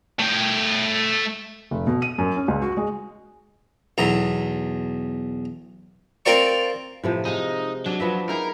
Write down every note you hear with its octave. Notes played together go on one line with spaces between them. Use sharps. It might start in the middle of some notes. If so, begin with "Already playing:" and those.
A3 G5
F1
B2
D#7
F#2
C#4
C#2
F#4
G#3
B1 E2 A#5
C4 F4 A#4 D5 C#6
A2 C3 F3
G#3 D#4 F5
F#3 D4
F3 B3 E5
D#4 E4 G#4 A#4